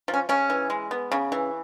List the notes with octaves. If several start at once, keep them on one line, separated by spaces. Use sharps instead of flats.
F3
C#4
C#3 C#4
E3
G#3
B3
C#3
E3